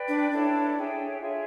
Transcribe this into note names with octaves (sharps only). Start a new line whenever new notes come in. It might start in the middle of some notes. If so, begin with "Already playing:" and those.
Already playing: B4 D5 G5
D4
D4 E4 A4 C#5
G#4 C#5 E5 G5
F4 G#4 C#5 E5